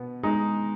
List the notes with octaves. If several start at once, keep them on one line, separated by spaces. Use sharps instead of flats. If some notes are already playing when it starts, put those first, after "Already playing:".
Already playing: B2 B3
G#3 D#4